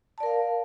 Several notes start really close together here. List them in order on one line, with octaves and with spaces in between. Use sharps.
A5 D5 A#4 F5